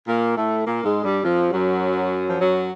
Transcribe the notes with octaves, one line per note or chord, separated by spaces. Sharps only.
A#2 A#3
A2 A3
A#2 A#3
G#2 G#3
G2 G3
F2 F3
G3
F#2 F#3
F3
F#2 F#3